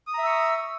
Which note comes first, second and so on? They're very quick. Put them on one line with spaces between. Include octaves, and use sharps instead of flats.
D#6 A#5 E5 E6 C#6